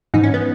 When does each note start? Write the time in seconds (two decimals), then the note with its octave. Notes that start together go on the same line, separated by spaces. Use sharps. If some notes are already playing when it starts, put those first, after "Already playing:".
0.14 G#2 E3 D#4
0.24 C#4
0.34 B3